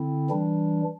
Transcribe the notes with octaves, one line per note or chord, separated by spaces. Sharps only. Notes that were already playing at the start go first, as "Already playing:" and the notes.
Already playing: D3 C4 E4
E3 G3 D4